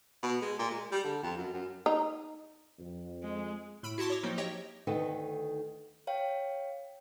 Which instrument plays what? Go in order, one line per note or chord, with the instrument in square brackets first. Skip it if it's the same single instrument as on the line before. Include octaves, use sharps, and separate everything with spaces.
[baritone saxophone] B2
G#3
A#2
G#3
G3
D3
F2
F#2
F#2
[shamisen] D#4
[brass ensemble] F2
[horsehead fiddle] G#3
[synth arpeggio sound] A2 B5 E6 D7
E4 F#4 A5 C6 D6
C#5 D6
F3 F#3 A#3 C4 D#4
F#4 G4 C#5 D#5 G5
[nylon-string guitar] D2 D#3 D#4 A4 B4 F#5
[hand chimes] C#5 F5 G5